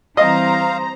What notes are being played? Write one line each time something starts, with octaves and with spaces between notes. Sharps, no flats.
E3 G3 C4 C5 D#5 F5 A#5